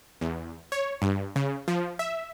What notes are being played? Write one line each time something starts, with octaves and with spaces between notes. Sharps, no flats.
E2
C#5
G2
C#3
F3
E5